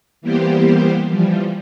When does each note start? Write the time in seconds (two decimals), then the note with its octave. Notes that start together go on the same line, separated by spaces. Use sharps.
0.22 E3 G3 A#3 B3 G4 C5
1.09 E3 F3 G3